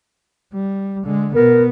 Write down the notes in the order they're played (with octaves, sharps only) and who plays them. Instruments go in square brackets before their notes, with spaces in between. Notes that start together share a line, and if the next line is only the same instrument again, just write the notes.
[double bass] G3
D3 G#3
[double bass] B2 B3 [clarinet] A#4